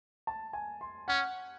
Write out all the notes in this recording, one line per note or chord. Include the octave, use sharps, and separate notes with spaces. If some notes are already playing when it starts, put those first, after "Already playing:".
A5
G#5
C6
C#4 F#5